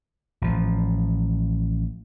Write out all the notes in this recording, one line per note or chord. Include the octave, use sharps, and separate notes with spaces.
A1 F3